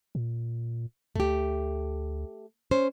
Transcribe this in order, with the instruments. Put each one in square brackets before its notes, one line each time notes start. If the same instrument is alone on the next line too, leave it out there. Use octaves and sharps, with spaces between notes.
[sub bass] A#2
[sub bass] D2 [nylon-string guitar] A3 G4
[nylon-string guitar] C#4 C5